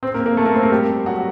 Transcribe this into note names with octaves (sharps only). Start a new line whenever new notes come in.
C4 C5
A#3 A#4
A#3 A#4
A3 A4
A#3 A#4
C4 C5
A#3 A#4
G3 G4
F#3 F#4